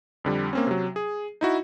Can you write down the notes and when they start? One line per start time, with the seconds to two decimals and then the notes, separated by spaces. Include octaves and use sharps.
0.24 F2 D3 G3
0.53 A#3 C4 C#4
0.67 C3 F#3
0.96 G#4
1.41 D#4 E4 F#4